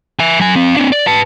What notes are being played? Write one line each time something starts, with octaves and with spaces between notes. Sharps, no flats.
E5 G#5
F#3 G#5
C4 F5
C4 D4
D5
B4 A5